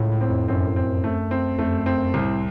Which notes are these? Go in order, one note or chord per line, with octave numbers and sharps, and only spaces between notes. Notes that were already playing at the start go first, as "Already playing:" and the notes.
Already playing: C#2 A2
A2
C4
F2
F#2 C4
C4
A3
C4
F2 A3
F#2
C4
F#2
C2 A2